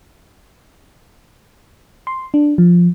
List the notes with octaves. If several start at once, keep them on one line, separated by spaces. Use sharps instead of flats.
C6
D4
F3